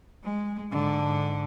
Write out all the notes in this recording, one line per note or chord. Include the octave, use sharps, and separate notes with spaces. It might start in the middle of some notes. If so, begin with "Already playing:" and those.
G#3
G#2 D3